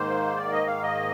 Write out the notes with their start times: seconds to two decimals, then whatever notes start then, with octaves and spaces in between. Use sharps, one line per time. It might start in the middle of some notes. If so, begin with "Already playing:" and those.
Already playing: G#2 D#3 A#3 C5
0.36 D5
0.52 D#5
0.67 F5
0.82 D#5